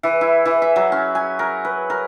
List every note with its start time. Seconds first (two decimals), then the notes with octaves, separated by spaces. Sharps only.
0.03 E3
0.21 E4
0.46 E3
0.62 E5
0.76 F#3
0.92 C#4
1.15 G#5
1.39 A#4
1.65 B4
1.90 A#4